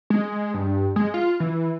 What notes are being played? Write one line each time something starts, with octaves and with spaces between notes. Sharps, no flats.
G#3
G2
G#3
F4
E3